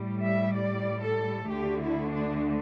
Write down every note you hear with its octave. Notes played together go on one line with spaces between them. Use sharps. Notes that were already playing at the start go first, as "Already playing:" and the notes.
Already playing: A2 G3
E5
D5
A4
D2 D3 A3 G4
E4
D4